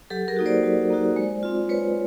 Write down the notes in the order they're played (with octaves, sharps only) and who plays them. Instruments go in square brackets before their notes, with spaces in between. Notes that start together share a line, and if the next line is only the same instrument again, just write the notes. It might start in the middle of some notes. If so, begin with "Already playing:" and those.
[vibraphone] F#3 G4 A4
G#4 A#4
A#3 D#4 F#4
C5 D5
F#3
A#3 D#4 F#4
G#3
C4 F4
G#3 B4 C#5